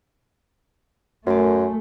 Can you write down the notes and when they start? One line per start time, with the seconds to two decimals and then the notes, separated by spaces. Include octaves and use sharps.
1.27 F#2 A3 F#4 A#4 G#5